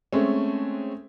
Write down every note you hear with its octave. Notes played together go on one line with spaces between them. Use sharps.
G#3 A3 C4 C#4